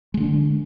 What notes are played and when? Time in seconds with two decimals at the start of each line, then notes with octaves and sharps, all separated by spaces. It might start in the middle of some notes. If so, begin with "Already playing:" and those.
0.14 G#3
0.17 D3
0.21 D4